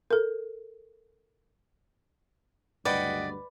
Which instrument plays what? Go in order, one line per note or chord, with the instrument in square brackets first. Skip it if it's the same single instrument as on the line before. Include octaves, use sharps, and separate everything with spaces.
[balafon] A4 A#4
[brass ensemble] F#1 D2 G2 [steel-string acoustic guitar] B4 [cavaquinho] D5 [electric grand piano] D#5 F#5 G5